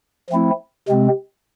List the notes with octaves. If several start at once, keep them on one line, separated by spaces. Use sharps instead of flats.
F3 A3 C4 E4
C3 G#3 C4